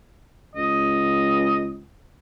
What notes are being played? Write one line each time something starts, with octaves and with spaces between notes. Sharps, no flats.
C#2 D#5